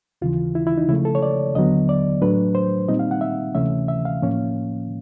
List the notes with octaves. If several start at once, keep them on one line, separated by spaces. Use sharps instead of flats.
D#2 C#3 E3 F4
E4
E4
D#4
C#3 F3 A3 E4
A4
C#5
D5
D#2 D3 F#3 B3 D#5
D5
A2 F#3 A3 D4 B4
C5
A#2 G3 C4 D#4 D#5
F5
F#5
E5
D2 C3 E3 A3 C#4 E5
E5
F5
A2 F3 A#3 C#4